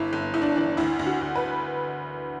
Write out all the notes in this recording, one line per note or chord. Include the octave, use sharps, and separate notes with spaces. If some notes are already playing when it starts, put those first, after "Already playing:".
Already playing: G1 E4
G1
G1 E4
D4
E3 D4
D2 E4
D2
F#4
D2
B4